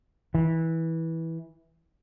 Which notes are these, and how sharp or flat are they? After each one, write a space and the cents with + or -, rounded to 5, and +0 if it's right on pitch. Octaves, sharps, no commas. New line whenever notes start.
E3 -15